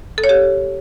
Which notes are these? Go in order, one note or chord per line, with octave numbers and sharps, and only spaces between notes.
A4
C#5
G4